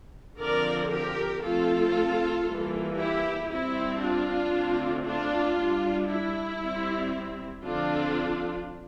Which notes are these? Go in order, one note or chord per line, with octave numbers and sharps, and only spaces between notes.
D3 F3 C4 A#4 D5
G4 A#4
F3 A3 C4 F4 A4
E3 G3 A#3
E4 G4
G3 C4 E4
D4 F4
D3 A3 C4
D4 F4
G3 D4
E4
G3 C4
D3 F3 C4 D4 F4